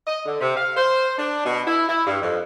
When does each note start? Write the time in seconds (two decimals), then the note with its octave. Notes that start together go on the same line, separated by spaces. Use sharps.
0.07 D#5
0.26 D3
0.41 C3
0.57 F5
0.77 C5
1.18 D4
1.45 B2
1.67 E4
1.89 E4
2.06 G2
2.21 F2